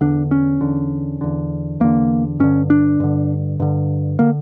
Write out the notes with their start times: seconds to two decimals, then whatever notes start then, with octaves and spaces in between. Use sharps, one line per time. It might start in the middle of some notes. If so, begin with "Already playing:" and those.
0.01 E2 D3 D4
0.31 C#4
0.61 E2 D3
1.21 E2 D3
1.80 E2 D3 A#3
2.40 G2 D3 C#4
2.70 D4
3.00 G2 D3
3.60 G2 D3
4.19 D3 A#3